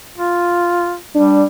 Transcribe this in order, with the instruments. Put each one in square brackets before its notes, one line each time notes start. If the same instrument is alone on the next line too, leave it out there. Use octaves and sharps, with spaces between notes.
[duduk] F4
[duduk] G3 [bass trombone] D4